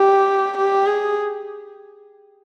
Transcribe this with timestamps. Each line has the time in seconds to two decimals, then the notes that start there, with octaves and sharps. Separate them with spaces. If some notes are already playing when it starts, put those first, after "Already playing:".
Already playing: G4
0.58 G4
0.86 G#4